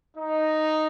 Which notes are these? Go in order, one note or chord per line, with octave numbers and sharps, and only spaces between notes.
D#4